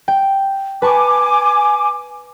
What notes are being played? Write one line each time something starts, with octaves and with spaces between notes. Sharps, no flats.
G5
B4 G#5 A5 C#6 D6